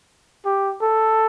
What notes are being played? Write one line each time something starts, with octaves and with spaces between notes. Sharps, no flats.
G4
A4